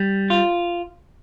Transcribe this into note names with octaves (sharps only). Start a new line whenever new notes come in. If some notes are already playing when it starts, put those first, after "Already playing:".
Already playing: G3
F4